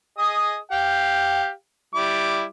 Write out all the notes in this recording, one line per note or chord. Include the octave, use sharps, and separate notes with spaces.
G#4 D#5 D#6
G4 F5 G5
G3 E4 D6